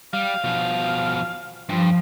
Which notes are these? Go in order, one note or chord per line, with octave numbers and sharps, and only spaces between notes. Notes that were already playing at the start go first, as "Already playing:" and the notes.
G3 F5
B2 F3
G2 F3